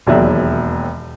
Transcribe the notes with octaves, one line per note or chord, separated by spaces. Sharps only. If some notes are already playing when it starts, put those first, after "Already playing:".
E1 D#2 F#3 D5 E5